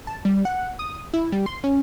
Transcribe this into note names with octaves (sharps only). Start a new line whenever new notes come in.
A5
G3
F#5
D#6
E4
G3
C6
C#4